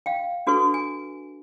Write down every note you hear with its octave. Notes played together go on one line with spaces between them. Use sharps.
F5 G5
D4 F#4 A4 B4 C#6
G#5